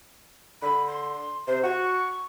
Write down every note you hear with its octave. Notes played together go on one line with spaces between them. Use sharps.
D3 B5
C6
C3 C5
F#4 C#6